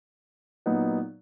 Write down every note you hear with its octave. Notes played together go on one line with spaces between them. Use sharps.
A#2 F#3 B3 D#4